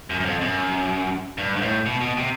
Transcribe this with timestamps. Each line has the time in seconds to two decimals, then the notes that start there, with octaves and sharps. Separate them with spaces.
0.10 F#2
0.20 F#2
0.25 F2
0.41 F#2
1.38 G2
1.56 G#2
1.61 A2
1.86 B2
2.01 B2
2.17 C3